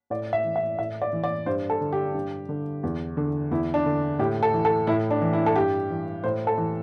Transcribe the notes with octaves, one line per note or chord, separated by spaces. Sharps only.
A2 D5
E5
E3
E5
A2 E5
D5
E3
D5
G2 C5
A4
D3
G4
G2
D3
E2
D3
E2 E4
D4
D3
A2 G4
A4
E3
A4
A2 E4
D4
E3
E4
A4
G2 G4
E3
A2 C5
A4
E3